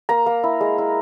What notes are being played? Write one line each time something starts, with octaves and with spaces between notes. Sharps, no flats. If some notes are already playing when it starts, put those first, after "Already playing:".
A#3 A#5
A#3
E4
G#3
E4